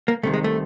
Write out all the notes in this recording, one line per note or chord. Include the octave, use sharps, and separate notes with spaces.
A#3
C2 C3 D#3 A3
G#3
A3